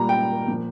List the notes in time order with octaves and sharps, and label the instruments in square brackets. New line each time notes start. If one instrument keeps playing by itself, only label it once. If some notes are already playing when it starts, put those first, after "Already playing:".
Already playing: [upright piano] A#2 G3 A#5
G5
A#2 F3